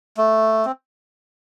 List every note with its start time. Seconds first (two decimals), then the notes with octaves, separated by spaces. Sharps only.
0.17 A3
0.65 C4